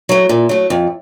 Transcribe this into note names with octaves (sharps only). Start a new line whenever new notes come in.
F#3 A3
A#2
F#3 A3
F2